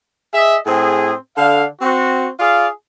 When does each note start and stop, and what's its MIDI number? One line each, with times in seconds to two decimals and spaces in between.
0.34 0.57 68
0.34 0.57 75
0.34 0.57 76
0.67 1.14 45
0.67 1.14 60
0.67 1.14 68
1.37 1.64 50
1.37 1.64 77
1.82 2.29 60
1.82 2.29 66
2.40 2.68 65
2.40 2.68 68
2.40 2.68 74
2.40 2.68 77